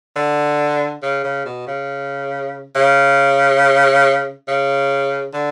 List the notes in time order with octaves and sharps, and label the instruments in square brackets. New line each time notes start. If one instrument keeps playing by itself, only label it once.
[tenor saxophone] D3
C#3
C#3
B2
C#3
C#3
C#3
D3